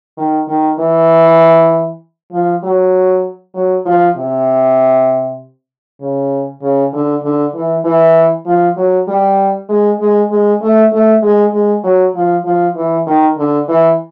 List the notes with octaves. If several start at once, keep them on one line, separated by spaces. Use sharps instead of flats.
D#3
D#3
E3
F3
F#3
F#3
F3
C3
C#3
C#3
D3
D3
E3
E3
F3
F#3
G3
G#3
G#3
G#3
A3
A3
G#3
G#3
F#3
F3
F3
E3
D#3
D3
E3